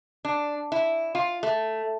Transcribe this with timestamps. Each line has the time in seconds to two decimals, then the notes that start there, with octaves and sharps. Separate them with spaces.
0.25 D4
0.72 E4
1.15 F4
1.43 A3